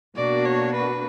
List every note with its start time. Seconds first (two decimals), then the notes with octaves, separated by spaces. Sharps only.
0.16 B2 A#3 D4 F#4 D5
0.45 C#5
0.73 B4